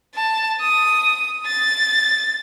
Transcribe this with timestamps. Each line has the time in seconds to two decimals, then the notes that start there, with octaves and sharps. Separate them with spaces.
0.15 A5
0.61 D#6
1.46 A6